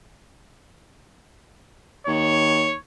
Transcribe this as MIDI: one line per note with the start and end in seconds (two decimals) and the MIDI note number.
2.07 2.75 39
2.07 2.76 73